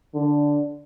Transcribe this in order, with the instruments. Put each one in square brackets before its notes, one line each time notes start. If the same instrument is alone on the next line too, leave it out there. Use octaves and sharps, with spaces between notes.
[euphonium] D3